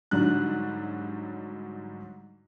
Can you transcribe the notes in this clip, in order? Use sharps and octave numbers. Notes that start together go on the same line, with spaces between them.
G#2 D3 F#3 G3 F#6